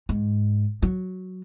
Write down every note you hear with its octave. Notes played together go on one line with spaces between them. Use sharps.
G#2
F#3